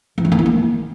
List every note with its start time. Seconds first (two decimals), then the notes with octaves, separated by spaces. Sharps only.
0.18 E3
0.25 G3
0.32 A#3
0.39 E4
0.46 A#3